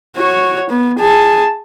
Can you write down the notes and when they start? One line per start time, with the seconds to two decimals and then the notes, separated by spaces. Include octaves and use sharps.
0.16 F#4 C#5
0.70 B3
0.99 G#4 A5